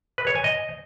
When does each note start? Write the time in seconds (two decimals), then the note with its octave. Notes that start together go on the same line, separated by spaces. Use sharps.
0.18 B4
0.27 C#5
0.36 G#5
0.44 D#5